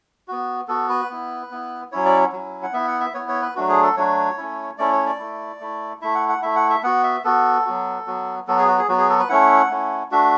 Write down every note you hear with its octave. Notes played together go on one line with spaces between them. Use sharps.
B3 F#4
B3 F#4 A4
B4
B3 E4
B3 E4
F#3 C#4 E4 C#5
D5
F#3 C#4 E4
F#5
B3 E4 E5
F#5
E5
B3 E4 C#5
C#5
B4
F#3 A3 D4 F#4
G#4
A4
F#3 A3 D4 F#4 C#5
A3 C#4 E4
A3 C#4 E4 D5
C#5
D5
A3 E4
A3 E4
A3 E4 E5
F#5
F#5
A3 E4 E5
F#5
E5
B3 F#4 F#5
E5
B3 F#4 A4
F#3 B3 F#4
F#3 B3 F#4
F#3 B3 F#4 A4
G#4
F#4
G#4
F#3 B3 F#4
G#4
A4
B4
A3 C#4 E4 F#5
A3 C#4 E4
A3 D4 F#4 E5